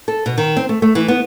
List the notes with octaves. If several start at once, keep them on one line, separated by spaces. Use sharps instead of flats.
A4
B2
D#3
C4
A3
A3
E3
B3